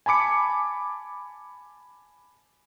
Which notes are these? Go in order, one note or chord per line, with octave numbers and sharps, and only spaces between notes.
G#5 A5 B5 D6 C#7